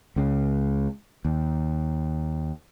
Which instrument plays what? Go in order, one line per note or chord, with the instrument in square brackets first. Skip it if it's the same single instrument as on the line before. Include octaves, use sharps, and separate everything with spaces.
[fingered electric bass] C#2 C#3
D#2